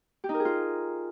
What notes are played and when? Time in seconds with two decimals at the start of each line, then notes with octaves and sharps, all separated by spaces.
0.24 G4
0.29 D#4
0.34 A#4
0.40 G#4
0.45 F4